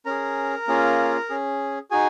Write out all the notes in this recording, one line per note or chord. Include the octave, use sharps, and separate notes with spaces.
C#4 G#4 A#4 A#5
A#3 C#4 F4 G#4
C#4 G#4
D#4 F#4 G#4 G#5